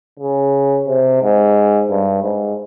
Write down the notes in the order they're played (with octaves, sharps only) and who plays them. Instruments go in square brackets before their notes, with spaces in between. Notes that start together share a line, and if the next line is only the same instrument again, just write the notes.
[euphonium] C#3
C3
G#2
G2
G#2